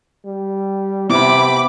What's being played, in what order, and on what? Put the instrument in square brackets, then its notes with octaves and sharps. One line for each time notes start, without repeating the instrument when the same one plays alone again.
[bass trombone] G3
[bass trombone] C3 [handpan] B3 E4 [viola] B5 D6